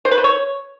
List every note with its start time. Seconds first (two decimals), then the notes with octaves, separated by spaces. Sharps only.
0.05 C5
0.11 B4
0.18 C5
0.24 C#5